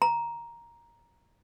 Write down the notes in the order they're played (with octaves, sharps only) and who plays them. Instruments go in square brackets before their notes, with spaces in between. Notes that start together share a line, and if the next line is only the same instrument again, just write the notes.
[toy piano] A#5